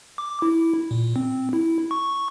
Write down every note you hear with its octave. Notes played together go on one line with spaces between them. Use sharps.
D6
E4
A#2
C4
E4
C#6